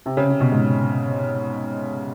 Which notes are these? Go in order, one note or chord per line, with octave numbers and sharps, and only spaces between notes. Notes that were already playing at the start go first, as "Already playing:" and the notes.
C3
C#3
C3
B2
G#2